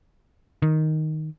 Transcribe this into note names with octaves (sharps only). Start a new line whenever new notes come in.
D#3